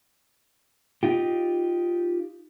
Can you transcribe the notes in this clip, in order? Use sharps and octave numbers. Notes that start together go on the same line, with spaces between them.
D#4 F4 G4